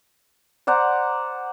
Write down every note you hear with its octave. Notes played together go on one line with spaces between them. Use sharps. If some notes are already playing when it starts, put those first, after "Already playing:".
C5 D5 F#5 A#5